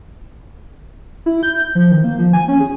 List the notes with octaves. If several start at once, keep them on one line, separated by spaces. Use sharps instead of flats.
E4
G6
F3
D#3
A#3
F3
G#5
C#4
G#4